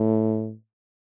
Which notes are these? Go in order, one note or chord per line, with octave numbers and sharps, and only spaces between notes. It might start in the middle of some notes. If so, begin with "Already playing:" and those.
Already playing: A2